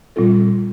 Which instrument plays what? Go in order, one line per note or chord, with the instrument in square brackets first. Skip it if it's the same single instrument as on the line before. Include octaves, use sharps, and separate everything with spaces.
[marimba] A#2 G3 C4 F4 A4